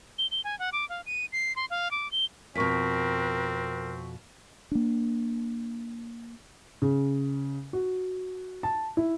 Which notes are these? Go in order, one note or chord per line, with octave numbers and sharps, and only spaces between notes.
G7
G7
G#5
F#5
D6
F5
D#7
C7
C6
F5
D6
G7
F2 B2 C4 A#4 C#6 B6
A#3 D4
C#3
F#4
A5
E4